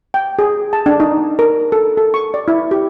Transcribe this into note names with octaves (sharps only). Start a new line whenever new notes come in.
G5
G#4
A5
D4
D#4
A#4
A4
A4
C#6
D5
E4
G4